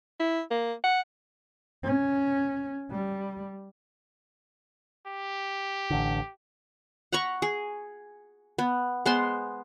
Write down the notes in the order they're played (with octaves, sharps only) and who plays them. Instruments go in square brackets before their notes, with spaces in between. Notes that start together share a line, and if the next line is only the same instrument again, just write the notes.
[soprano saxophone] E4
A#3
F#5
[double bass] C#4
G3
[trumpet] G4
[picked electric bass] A1 D3
[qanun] F#5 A#5 B5 C#6
G#4
B3
G#3 B3 C5 C6